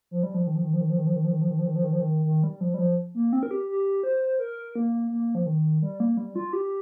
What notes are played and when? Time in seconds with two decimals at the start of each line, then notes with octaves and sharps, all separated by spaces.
0.11 F3
0.23 G3
0.34 F3
0.47 D#3
0.55 F3
0.64 D#3
0.74 F3
0.81 D#3
0.90 F3
0.98 D#3
1.07 F3
1.16 D#3
1.24 F3
1.32 D#3
1.41 F3
1.51 D#3
1.59 F3
1.67 D#3
1.76 F3
1.84 D#3
1.93 F3
2.01 D#3
2.25 D#3
2.43 G3
2.61 F3
2.74 G3
2.78 F3
3.15 A#3
3.33 C4
3.43 A#4
3.51 G4
3.69 G4
4.03 C5
4.39 A#4
4.75 A#3
5.11 A#3
5.35 F3
5.46 D#3
5.82 G3
6.00 A#3
6.17 G3
6.36 F4
6.53 G4